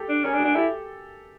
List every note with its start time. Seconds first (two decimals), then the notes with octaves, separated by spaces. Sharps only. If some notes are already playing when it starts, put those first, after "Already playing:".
Already playing: G4 A4
0.09 D4
0.24 C#4 G#4 A#4
0.34 D4
0.40 F#4 G#4
0.45 D4
0.55 E4 G4 A4